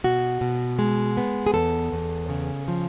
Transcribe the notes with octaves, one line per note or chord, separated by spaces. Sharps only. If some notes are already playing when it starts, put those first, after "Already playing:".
B2 F#4
B2
G#3
B3
G#4
E2 A4
E2
C#3
F3